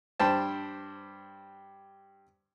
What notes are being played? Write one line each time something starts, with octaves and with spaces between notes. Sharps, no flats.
G2 C5 G5 A5